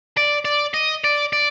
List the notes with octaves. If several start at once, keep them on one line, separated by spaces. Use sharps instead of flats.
D5
D5
D#5
D5
D5